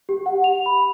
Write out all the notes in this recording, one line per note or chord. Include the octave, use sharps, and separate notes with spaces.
G4
F#5
F7
B5